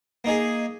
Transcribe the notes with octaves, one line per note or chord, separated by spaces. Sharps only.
A#3 D#4 G#4